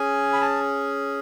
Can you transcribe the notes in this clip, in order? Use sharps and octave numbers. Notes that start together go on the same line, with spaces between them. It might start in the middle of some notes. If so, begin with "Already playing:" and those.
Already playing: C#4 G#4 G#5
B5
A5